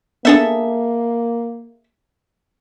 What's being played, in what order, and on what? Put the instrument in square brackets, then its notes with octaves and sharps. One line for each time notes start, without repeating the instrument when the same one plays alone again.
[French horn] A#3 [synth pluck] B3 D4 [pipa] G#4 A4 E5